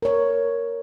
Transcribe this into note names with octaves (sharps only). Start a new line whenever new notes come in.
A#4 C#5